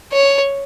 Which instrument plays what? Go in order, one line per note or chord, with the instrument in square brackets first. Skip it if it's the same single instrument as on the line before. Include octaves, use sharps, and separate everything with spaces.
[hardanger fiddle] C#5